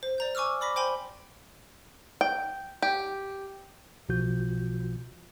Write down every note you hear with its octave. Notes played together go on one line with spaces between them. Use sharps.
C5
D5 A#5 G6
G#5 C#6 D6 E6 F6
D5 B5 D6 A#6 B6
C5 G5 G#5 B5 C6 G6
G5
G4
B1 B2 F3 F4 F#4 G6